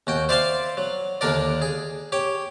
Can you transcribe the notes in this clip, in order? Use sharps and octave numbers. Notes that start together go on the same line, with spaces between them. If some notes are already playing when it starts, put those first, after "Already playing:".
D#2 F#4 G5
C5 D5 E5 F5 A5 C6
F#3
D#2 D3 D4 A#4 D5
G#4
G4 C#5 G5